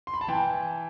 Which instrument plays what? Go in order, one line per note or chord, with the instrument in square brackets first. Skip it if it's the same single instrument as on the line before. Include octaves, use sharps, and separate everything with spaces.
[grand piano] C6
B5
A5
E3 G5